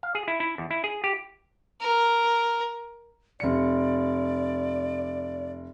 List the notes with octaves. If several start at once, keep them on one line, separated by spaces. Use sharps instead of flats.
F5
G#4
E4
E4
E2
E4
G#4
G4
A#4
F1 D5 C#7